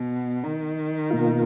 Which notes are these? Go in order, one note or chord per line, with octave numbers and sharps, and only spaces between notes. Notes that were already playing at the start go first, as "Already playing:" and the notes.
Already playing: B2
D#3
B2 A#3 F4